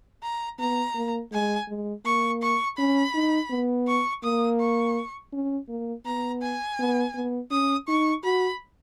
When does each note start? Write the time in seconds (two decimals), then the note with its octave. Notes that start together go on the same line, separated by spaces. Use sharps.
0.23 A#5
0.59 B3 A#5
0.95 A#3
1.32 G#3 G#5
1.68 G#3
2.05 A#3 C#6
2.42 C#6
2.78 C#4 B5
3.15 D#4
3.50 B3
3.87 C#6
4.24 A#3 D#6
4.60 C#6
5.33 C#4
5.69 A#3
6.06 B3 A#5
6.42 G#5
6.79 B3
7.15 B3
7.51 C#4 D#6
7.88 D#4 C#6
8.24 F#4 B5